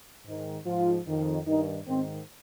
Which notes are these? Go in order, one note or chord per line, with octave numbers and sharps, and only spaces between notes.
G#2 D#3
G#2 F3 F4
F2 D#3
G2 D#3 D#4
G#2 D#3 C4